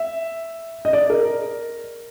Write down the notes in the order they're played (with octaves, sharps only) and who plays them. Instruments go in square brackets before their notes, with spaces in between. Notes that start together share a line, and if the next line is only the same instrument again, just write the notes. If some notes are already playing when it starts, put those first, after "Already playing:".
Already playing: [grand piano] E5
D#5
D5
A#4